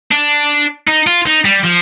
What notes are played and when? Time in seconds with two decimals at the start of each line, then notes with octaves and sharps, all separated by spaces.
0.12 D4
0.88 D#4
1.07 F4
1.26 D#4
1.45 G3
1.64 F3